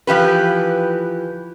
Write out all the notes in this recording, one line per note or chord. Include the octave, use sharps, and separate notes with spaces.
E3 F3 G4 B4